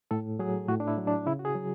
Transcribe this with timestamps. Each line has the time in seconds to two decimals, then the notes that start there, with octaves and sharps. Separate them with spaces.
0.11 A2 A4
0.39 F#3 G#4
0.68 A2 F#4
0.80 D4
0.88 E4
0.98 F#3
1.07 D4
1.26 C#3 E4
1.39 F#4
1.45 G#4
1.55 F#3